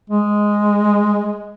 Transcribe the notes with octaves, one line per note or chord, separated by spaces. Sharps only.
G#3